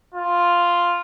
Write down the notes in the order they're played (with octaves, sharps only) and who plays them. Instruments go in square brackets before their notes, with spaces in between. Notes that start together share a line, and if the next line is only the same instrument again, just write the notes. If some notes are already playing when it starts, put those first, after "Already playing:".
[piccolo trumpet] F4